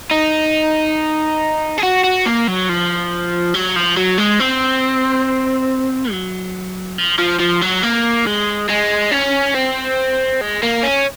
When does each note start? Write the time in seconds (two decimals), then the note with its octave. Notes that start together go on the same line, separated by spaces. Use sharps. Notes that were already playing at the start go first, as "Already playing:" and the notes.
0.11 D#4
1.78 G#4
1.83 F#4
2.04 F#4
2.26 A#3
2.47 F#3
2.69 F3
3.54 F#3
3.76 F3
3.97 F#3
4.18 G#3
4.40 C4
6.11 F#3
6.98 F3
7.19 F3
7.40 F3
7.62 F#3
7.83 A#3
8.26 G#3
8.70 G#3
9.12 C#4
9.55 C4
10.41 G#3
10.63 A#3
10.83 C#4